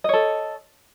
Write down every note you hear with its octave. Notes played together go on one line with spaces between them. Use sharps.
A4 C#5 D#5